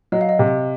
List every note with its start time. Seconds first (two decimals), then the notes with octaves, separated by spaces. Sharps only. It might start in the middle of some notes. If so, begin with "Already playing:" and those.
0.12 F#3 D#5
0.21 F5
0.29 D#5
0.39 C3